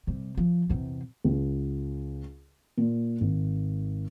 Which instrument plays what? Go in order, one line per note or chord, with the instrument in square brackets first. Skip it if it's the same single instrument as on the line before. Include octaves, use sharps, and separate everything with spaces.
[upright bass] C3 G3
F3
E2 C3
[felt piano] C#2
A#2
G#1